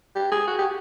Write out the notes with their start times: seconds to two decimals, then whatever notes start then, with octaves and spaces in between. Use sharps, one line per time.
0.16 G4
0.32 G#4
0.47 F#4
0.58 G4